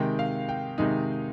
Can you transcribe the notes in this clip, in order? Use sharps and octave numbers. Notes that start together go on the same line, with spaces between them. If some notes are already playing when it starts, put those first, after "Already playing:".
Already playing: C3 D#3 G#3 D#4 G5
F5
G5
C3 D#3 G#3 D#4